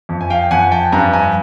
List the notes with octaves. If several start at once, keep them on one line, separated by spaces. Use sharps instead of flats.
F2
G#5
F5 G5
F2 F#5 G#5
G5 A5
G2 G#5 A#5
G#5 A#5